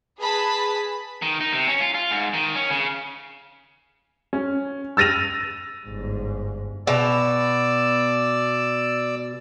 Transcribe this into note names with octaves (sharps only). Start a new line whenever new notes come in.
G#4 B4 A5 B5
D#3
D#4
C3
C#4
F4
F4
G#2
D#3
C#4
C#3
C#4
E6 A6 A#6 D#7 F7
G1 G#2
B2 D5 E6